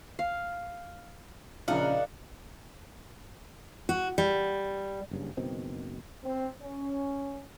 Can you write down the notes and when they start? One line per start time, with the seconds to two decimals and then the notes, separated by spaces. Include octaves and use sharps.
0.19 F5
1.68 A#1 C#3 D4 D#4 A#4 F5 F#5
3.89 F#4
4.18 G3
5.11 F#1 G2 C#3
5.37 F#1 B2 D#3 C4
6.24 C4
6.60 C#4